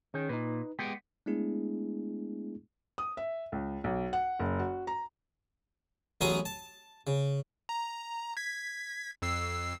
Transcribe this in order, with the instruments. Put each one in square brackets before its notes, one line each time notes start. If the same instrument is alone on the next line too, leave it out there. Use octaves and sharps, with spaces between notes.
[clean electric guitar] D#3 [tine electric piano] C#4 G#4 C#5
[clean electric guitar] A#2 [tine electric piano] D#4 B4
[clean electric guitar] G#3 B3 G4 [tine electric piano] B6
[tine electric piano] G#3 A3 B3 D4 E4 G#4
[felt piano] D#6
E5
C#2
B1
F#5
F#1
F#4
A#5
[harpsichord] A1 F#3 B3 C#4 G#4 A#5
A5
C#3
[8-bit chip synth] A#5
G#6 B6
F2 E6 C7